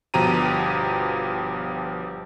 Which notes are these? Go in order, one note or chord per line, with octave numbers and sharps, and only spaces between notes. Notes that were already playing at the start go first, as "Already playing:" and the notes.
G1 B2 F3 G4 A#5 D#7